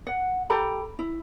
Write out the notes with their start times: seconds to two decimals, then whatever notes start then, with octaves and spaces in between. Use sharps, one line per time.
0.07 F#5
0.50 G4 A4 A#5 B5
0.99 E4